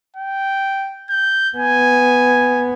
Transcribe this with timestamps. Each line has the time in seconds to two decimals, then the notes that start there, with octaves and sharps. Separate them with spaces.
0.16 G5
1.10 G6
1.57 B3 G#5